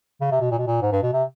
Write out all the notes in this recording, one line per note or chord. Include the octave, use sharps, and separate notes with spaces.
C#3
C3
B2
A#2
B2
A#2
G#2
G2
B2
C3